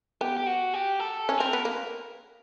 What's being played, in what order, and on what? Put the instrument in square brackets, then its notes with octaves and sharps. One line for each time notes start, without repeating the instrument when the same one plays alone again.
[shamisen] B3 [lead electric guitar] G4
[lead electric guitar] G4
F#4
G4
A4
[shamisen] C#4
[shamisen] C4 [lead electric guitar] A#4
[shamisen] B3
A#3